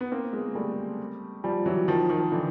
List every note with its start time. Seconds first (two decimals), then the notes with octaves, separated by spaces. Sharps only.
0.01 B3
0.11 A#3 C4
0.33 G#3 A#3
0.55 G3 A3
1.44 F3 G3
1.66 E3 F#3
1.88 D#3 F3
2.10 D#3 F3
2.32 D3 E3